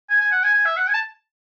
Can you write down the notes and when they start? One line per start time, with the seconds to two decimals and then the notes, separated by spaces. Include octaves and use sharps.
0.10 G#5
0.21 G#5
0.32 F#5
0.44 G#5
0.54 G#5
0.65 E5
0.77 F#5
0.88 G#5
0.94 A5